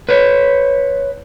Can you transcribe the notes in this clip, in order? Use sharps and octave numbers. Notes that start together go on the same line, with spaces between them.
B4 C#5